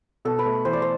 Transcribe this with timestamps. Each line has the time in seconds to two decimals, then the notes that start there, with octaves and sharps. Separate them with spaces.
0.25 B2 A4
0.39 B4
0.46 A3
0.65 E3 C5
0.73 D5
0.82 C5